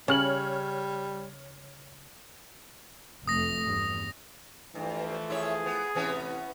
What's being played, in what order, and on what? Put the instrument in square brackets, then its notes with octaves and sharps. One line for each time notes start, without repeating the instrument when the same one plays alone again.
[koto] C#3 [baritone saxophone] G3 [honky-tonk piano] C#5 F6 F#7
[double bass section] F1 F2 A3 [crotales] D#6 A#6
[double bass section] E2 G2
[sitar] G2 [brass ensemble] E3 F3 A3
[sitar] E4 C#5 [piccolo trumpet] G#4
[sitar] B3
[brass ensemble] A2 C3 [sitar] E3 B3 C#4